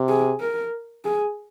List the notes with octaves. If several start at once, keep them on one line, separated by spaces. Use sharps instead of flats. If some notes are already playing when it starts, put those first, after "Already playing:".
Already playing: C3
G#4
A#4
G#4